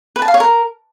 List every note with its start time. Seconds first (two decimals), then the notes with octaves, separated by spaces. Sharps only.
0.16 B4
0.22 A5
0.28 F5
0.34 C#5
0.40 A#4